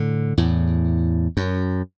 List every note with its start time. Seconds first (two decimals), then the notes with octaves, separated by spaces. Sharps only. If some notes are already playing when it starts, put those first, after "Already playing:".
Already playing: A2 D3
0.37 E2 A2
1.37 F#2